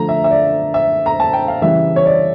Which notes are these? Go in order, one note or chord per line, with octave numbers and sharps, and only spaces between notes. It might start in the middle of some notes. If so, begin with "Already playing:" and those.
Already playing: D3 F3 A3 A#5
E5
E5
D5
E5
A#5
A5
G5
F5
C#3 E3 G3 E5
C#5
D5